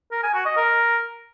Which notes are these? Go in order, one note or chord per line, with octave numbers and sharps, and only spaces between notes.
A#4
G#5
F#4
D#5
A#4